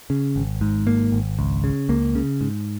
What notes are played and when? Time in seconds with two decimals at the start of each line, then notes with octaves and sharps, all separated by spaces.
0.10 C#3
0.36 G#1
0.61 G#2
0.87 G#1 A#3
1.12 G#1
1.39 C#2
1.64 C#3
1.89 C#2 A#3
2.15 C#3
2.41 G#2